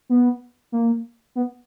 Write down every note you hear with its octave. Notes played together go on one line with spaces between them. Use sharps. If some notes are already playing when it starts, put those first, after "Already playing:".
B3
A#3
B3